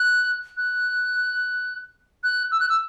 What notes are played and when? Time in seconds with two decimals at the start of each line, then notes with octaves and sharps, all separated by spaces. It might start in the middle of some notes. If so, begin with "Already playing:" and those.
Already playing: F#6
0.57 F#6
2.24 F#6
2.52 E6
2.60 F#6
2.69 E6